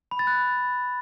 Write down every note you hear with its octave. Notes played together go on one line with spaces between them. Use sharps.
B5
A6
F#6